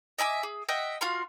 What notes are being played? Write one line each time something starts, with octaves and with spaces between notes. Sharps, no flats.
D#5 E5 G#5 D6
G#4
D#5 E5 F#5 G5
F4 F#4 F5 C6